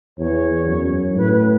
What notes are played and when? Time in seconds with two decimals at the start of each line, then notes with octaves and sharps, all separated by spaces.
0.18 E2 C#5
0.67 F#2
1.16 A2 B4
1.33 B4